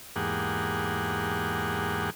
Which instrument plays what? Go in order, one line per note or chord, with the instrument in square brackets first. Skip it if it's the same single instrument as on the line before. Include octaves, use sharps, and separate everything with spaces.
[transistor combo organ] E2 G#2 A#3 G4 G#4 F#5